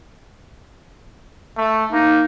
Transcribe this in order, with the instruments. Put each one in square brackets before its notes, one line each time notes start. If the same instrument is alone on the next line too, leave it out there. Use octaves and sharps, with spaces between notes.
[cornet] A3
[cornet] A#3 [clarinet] D#4